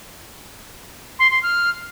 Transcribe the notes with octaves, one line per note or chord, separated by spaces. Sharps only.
C6
C6
F6